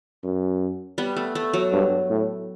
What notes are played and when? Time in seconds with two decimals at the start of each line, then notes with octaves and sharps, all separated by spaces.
0.24 F#2
0.98 G3 B3
1.16 A3
1.35 A3
1.53 F#3
1.73 G2
2.10 A2